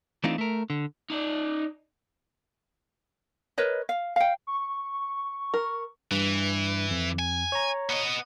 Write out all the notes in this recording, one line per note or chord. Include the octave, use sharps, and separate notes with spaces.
E3 A3 C4 D4 D#4 F4
A3 A#4
D3
D#4 D5
A#4 B4 C#5 D#5
F5
F5 G5
C#6
A#4
G2 E3
F2
G#5
C#5 A#5
B3 D#5